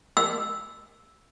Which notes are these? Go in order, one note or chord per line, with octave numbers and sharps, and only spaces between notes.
E6